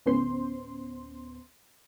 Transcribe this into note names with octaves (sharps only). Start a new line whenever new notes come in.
D2 A2 B3 C#4 C5 C6